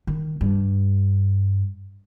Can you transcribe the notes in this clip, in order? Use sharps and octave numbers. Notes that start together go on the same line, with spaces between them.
D#3
G2